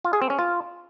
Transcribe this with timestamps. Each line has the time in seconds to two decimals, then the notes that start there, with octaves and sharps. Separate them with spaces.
0.04 F4
0.13 G#4
0.22 C4
0.30 C#4
0.39 F4